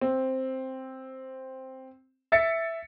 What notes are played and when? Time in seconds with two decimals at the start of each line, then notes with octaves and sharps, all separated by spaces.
0.01 C4
2.32 E5 A6 C#7